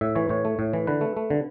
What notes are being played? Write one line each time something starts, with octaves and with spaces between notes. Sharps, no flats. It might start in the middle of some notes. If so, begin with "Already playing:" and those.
A2 E5
E3 C#5
A2 C#5
A3
A2
E3
D3 B4
A3
A3
D3